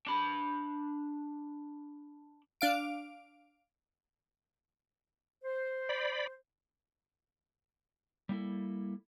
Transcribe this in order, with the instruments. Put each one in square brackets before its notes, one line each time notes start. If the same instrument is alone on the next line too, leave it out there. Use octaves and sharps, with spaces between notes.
[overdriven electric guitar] D4 B5
[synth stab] D4 F5 D7
[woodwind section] C5
[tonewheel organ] D5 B5
[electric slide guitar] G3 A#3 E4 A4